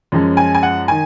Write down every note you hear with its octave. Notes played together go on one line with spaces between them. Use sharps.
F#2 F3 G#3 C#4
G#5
G#5
F#5
D#3 G#5